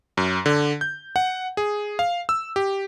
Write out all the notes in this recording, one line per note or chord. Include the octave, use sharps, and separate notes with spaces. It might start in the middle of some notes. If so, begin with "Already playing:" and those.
F#2
D3
G6
F#5
G#4
F5
E6
G4